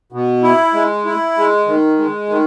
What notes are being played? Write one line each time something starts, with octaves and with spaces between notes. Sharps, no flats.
B2
E4
G#3
E4
G#3
D#3
G#3
D#3